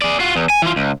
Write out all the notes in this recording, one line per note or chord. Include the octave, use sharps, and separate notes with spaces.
G#4 D5
F4 F#4
E2
G#5
E3 F4
C#2